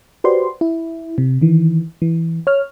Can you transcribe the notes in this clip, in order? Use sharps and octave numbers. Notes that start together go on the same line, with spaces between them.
F#4 G4 B4 C5 D5 C6
E4
C3
D#3 E3
E3
C#5 F6